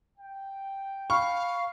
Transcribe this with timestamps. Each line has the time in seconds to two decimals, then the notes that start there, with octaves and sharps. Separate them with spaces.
0.18 G5
1.10 F5 B5 C#6 F6